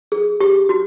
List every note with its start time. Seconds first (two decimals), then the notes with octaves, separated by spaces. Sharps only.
0.12 G#4
0.40 G4
0.69 F#4